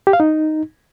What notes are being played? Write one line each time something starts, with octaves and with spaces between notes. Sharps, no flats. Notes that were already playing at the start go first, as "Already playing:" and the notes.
G4
F5
D#4